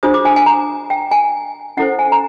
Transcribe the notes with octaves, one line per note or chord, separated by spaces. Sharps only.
D4 F4 G#4 C5 D#6
D6
G#5
G#5
A#5
G5
G#5
C#4 E4 A4 C5 F#5
G#5
A#5